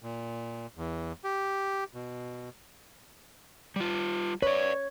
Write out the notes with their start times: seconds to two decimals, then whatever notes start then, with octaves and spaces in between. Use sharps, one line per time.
0.03 A#2
0.77 E2
1.24 G4
1.94 B2
3.76 G3 F4
4.42 B4 C#5 D5